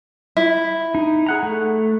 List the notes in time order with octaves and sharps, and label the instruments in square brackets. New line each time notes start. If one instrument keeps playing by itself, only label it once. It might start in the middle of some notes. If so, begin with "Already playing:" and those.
[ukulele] E4
[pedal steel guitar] D#4
G#4 F#5 A#5
A3